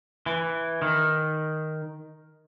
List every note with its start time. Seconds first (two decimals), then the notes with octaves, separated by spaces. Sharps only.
0.26 E3
0.82 D#3